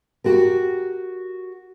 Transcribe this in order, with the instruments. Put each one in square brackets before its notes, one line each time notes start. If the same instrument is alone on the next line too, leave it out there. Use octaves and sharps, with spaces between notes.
[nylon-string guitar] F#4 G4 A#4